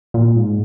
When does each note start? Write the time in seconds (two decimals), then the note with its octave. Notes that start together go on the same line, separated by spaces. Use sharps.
0.14 A#2
0.36 G#2